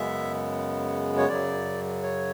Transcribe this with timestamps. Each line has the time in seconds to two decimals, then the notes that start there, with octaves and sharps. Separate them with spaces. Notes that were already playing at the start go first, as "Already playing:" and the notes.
Already playing: F#2 C#3 G#3 B3 E5
1.18 C#5
1.29 F#2 C#3 F#3 D5
2.03 C#5